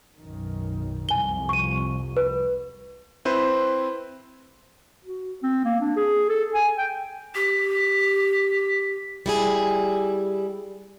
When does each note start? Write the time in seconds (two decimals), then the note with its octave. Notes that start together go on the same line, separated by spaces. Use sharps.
0.20 B1 F#2 D#3
1.09 C2 F2 G#5 G7
1.49 C#6 D#7
2.17 B4
3.25 C4 E4 B4 C5
5.04 F#4
5.43 C4
5.65 A#3
5.81 D4
5.96 G#4
6.29 A4
6.54 G#5
6.78 G5
7.35 G4 B6
9.26 G3 E4 G#4